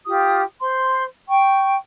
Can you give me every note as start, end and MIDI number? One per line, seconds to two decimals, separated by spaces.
0.06 0.40 65
0.06 0.40 67
0.06 0.40 87
0.59 1.03 72
0.59 1.03 84
1.28 1.74 79
1.28 1.74 85